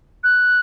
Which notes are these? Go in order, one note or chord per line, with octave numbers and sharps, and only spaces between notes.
F#6